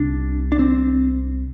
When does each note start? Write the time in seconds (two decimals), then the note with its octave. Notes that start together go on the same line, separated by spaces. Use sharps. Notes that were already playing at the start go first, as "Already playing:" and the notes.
Already playing: C2 C3 D4
0.52 D4
0.59 C4